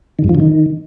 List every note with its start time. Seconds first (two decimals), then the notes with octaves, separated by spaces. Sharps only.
0.19 D#3
0.24 G2
0.29 F3
0.35 D3
0.40 D#3